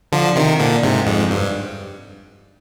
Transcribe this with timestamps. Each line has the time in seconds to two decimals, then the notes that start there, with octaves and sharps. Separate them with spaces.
0.12 D3 F3
0.36 C3 D#3
0.60 A#2 D3
0.83 G#2 C3
1.07 F2 G#2
1.31 G2